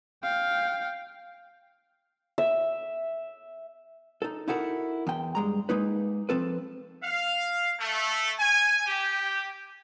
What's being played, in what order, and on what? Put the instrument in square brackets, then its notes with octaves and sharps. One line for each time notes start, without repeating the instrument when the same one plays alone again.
[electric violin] F5 G5
[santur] E5
[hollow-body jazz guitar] D#4 A4
D#4 E4 F#4 A4 A#4
E2 G5
G2 G#3 A#5
G#3 A#3 D#4 B4
F3 C4 A4 B4
[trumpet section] F5
A3
G#5
G4